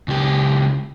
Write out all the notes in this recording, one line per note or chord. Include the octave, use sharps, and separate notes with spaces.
C#2 G4